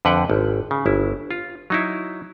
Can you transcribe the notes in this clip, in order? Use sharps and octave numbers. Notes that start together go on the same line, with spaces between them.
F2 D3 B4 F#5 G5
G#1
C#3
G1 E4
F4
F#3 D#4 E4